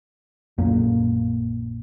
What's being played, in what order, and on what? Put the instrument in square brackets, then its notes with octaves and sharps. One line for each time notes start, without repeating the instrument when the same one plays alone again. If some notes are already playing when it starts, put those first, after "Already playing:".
[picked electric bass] A#1 F#2 A#3